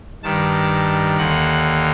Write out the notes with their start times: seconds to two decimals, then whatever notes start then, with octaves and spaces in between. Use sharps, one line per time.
0.23 G2 D#3 A5
1.17 D#2 D3 F#5